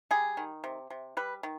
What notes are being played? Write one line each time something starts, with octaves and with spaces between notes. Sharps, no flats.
G3 G#4
D#3
C3
C3
G3 B4
D#3